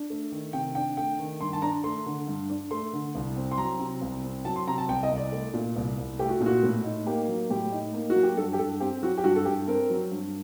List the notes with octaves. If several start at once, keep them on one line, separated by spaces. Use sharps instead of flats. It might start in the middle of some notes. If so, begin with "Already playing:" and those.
Already playing: D4
A3
D#3
C3 G5
D4 G5
A3 G5
D#3
G2 C6
A5
D4 A#5
A3 C6
D3
G2
D4
A3 C6
D3
C2
C4
C6
F#3 A#5
C3
C2
C4
F#3 A5
C6
C3 A#5
A5
C2 G5
D#5
C2
D5
A3
A#2
C2
C2
A3 G4
F#4
A#2
F#4
A2
D#4
A#3 G4
F#3
A2 G4
D#4
A#3
F#4
F#3
G4
G2 A4
G4
G2 A4
C4 G4
F#3 F#4
G4
G2 F#4
A4
G2 G4
C4 A#4
F#3
G2